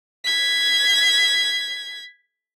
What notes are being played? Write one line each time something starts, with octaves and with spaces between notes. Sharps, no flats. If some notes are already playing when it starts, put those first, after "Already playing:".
G#6 B6